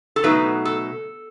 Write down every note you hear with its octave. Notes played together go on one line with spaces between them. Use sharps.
A4
B2 F#3 A3 D#4 B4
A4